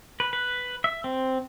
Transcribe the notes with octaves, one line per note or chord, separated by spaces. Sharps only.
B4
B4
E5
C4